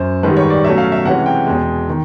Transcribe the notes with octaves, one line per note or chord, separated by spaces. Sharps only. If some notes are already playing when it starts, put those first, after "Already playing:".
Already playing: F#2 C5
G#2 D#3 G3 B4
C#5
D5
B2 F#3 A3 C#4 E5
F5
E5
C3 E3 G#3 C#4 F#5
G5
E2 B2 G#3
D#3